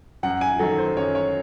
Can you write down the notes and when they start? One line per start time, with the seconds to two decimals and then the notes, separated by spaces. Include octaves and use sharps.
0.23 F#2 F#5
0.41 G#5
0.59 D#3 F#3 A4
0.78 C5
0.97 F#2 C#5
1.15 C#5